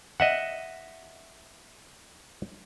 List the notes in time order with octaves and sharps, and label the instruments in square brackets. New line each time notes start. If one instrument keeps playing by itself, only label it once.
[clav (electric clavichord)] D#5 E5 F#5